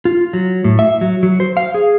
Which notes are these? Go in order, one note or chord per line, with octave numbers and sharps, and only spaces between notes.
F4
F#3
A2
E5
F#3
F#3
C5
F5
G#4